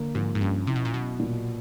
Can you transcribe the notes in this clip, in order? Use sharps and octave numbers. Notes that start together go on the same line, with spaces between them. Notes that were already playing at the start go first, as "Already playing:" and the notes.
Already playing: D3 A#3
G#2 F3
G#2
G2 C#4
C3 E4
B2
A#2
B2 F#3
A#2